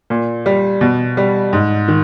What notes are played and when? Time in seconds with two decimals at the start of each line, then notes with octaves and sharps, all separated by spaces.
0.10 A#2
0.46 G3
0.81 B2
1.17 G3
1.53 G#2
1.88 D#3